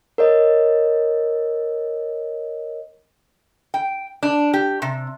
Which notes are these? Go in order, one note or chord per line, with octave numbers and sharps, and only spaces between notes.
A#4 C#5 D#5
G5
D4
G4
C3